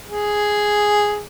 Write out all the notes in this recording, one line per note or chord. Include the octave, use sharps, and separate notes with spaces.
G#4